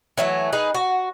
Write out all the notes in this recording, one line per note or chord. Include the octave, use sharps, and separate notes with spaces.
E3 F#3 A3
D#4 G#4 B4
F#4